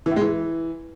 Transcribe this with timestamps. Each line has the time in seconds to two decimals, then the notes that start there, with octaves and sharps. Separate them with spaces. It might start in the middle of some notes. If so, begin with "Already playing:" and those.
0.06 E3
0.11 A2
0.16 G#3
0.22 E3